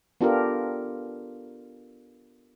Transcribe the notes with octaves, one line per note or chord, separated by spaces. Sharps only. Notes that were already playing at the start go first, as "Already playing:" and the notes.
B3 D4 F4 G4 A4 A#4